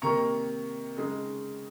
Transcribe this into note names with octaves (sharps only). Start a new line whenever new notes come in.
C3 D#3 A#3 A#5 C#6
C#3 G#3 D#4